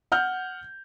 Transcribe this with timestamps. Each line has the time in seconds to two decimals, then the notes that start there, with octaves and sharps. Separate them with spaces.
0.12 F#5 F6 G6